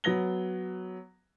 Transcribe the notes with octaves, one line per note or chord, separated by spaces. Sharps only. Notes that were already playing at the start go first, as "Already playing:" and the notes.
F#3 B3 A#6 G7